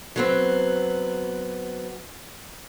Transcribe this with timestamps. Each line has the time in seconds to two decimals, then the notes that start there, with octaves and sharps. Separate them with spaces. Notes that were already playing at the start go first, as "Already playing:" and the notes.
0.16 F#3 B3 C4